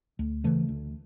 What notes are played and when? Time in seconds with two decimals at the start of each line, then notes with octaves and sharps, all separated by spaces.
0.19 D2
0.44 C#3 E3 A3
0.68 D2